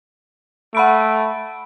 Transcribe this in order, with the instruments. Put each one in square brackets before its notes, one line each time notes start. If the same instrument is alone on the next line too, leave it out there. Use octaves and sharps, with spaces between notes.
[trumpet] A3 [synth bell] F#5 B5 D7